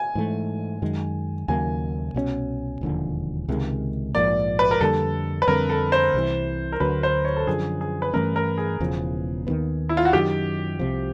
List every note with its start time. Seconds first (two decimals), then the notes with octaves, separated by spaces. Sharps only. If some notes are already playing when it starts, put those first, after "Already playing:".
Already playing: G#5
0.15 G#2 E3 A3
0.82 F#2 D#3 G#3
1.48 D#2 C#3 F#3 A#3 G#5
2.14 C2 B2 G#3 C#4
2.81 E1 D#2 D3 F3
3.48 C#2 C3 D#3 G#3
4.15 A#1 G#2 F3 A#3 D5
4.59 B4
4.71 A#4
4.80 F2 D3 G3 A#3 A4
5.42 B4
5.47 F2 D3 G3 C4 A#4
5.69 A4
5.92 C5
6.14 C2 C3 E3
6.72 A#4
6.80 D2 D3 F#3 B4
7.03 C5
7.25 C#5
7.36 A4
7.47 F#2 D3 F3 G#4
7.81 G#4
8.02 B4
8.13 G2 E3 A3 C#4 A#4
8.36 A#4
8.58 G#4
8.80 E1 E2 C#3 F3
9.47 D#2 D#3 F#3 B3
9.89 E4
9.97 F4
10.05 F#4
10.13 F#2 D#3 F#3 G4
10.79 C2 C3 F3